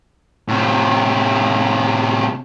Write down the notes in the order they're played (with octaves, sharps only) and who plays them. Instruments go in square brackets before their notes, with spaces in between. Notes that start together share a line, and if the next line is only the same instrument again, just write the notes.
[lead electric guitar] A2 C3